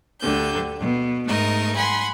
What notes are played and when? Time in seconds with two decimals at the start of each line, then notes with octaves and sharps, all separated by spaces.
0.21 D2 D3 G4 G6
0.80 B2
1.27 G#2 A3 D#4 A#4 D#5
1.75 F#5 G#5 B5 C6